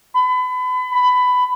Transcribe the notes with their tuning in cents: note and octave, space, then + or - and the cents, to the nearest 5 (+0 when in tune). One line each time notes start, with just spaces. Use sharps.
B5 +30
B5 +15